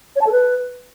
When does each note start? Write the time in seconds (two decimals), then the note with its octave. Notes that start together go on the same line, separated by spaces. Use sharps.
0.16 C#5
0.21 A5
0.26 A4
0.32 B4